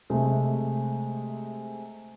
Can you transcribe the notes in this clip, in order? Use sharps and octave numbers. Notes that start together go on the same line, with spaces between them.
C3 G#3 A3